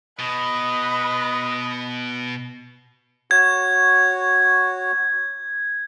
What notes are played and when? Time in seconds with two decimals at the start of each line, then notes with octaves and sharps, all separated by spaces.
0.19 B2 B4 D#5
3.31 F#4 C#5 G#6